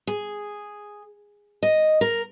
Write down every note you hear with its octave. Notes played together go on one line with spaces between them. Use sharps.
G#4
D#5
A#4